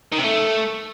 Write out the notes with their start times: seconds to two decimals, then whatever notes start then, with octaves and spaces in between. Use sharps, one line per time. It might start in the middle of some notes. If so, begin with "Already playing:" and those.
0.12 D#3
0.18 C3
0.24 A3